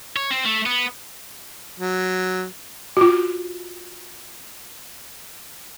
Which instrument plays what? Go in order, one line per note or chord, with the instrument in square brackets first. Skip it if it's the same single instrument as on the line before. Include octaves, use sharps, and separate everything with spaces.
[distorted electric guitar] C#5
C4
A3
B3
[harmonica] F#3
[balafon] F4 F#4